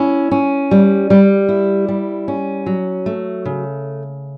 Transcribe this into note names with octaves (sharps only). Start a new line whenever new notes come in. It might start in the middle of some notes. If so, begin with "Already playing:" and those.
Already playing: C#4 E4
C#4
G3
G3
E4
G3
C#4
F#3
A3
C#3